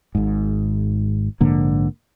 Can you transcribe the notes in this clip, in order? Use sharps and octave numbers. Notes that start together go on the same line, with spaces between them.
G#1 G#2
A#1 G#2 D3 A#3